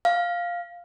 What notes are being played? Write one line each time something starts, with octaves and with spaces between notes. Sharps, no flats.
F5